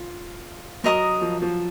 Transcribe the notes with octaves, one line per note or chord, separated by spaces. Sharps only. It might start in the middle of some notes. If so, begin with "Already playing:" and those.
Already playing: F4
F#3 A#4 D#5 A#5 D#6
F3
F3